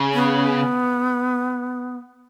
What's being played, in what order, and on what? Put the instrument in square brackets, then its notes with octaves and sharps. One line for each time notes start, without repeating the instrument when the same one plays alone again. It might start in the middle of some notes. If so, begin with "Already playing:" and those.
Already playing: [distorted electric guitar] C#3
[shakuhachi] B3